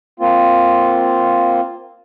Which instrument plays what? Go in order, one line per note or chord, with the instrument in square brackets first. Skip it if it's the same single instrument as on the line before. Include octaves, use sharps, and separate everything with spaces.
[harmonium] A#3 C4 F4